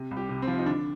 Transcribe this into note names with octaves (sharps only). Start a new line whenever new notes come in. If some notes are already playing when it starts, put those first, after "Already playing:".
Already playing: C3
C2
G4
C3
C4
F3
D#4
D3 D4